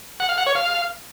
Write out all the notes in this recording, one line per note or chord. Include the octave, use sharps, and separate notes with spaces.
F#5
F5
F#5
C#5
F5